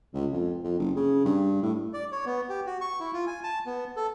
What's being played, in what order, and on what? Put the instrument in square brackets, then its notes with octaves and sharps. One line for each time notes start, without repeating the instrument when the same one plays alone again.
[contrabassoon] C#2
F2
F2
F#1
C#3
G2
A2
[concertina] D5
C#5
B3
G4
F#4
C#6
E4
F4
G#5
A5
B3
A4